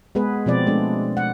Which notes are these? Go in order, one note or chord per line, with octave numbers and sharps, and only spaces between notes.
G#3 B3 G#4 B4
B2 F3 C4 D5
G#3 A3 D4
F#5